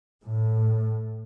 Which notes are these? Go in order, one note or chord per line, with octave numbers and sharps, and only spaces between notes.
A2